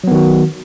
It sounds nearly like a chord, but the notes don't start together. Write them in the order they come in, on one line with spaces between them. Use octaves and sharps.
F#3 B3 D#3 F#4